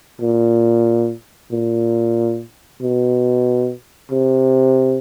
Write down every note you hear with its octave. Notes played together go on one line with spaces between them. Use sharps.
A#2
A#2
B2
C3